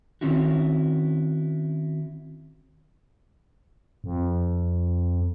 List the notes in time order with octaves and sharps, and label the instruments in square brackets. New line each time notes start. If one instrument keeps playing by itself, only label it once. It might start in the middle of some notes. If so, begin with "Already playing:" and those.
[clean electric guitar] D#3 C4 C#4 E4 F#4
[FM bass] F2